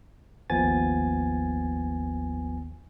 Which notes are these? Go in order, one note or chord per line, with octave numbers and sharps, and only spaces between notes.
G#1 D#2 F3 B3 G#5 A6